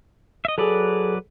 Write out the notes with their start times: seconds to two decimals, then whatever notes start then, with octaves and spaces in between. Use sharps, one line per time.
0.45 D#5 E5
0.58 F#3 G#4 A4 B4 D5